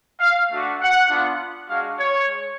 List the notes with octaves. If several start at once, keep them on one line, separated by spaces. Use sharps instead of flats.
F5
A3 D4 F#4
F#5
B3 D4 F4
G#3 D4 F#4 F5
C#5
G#3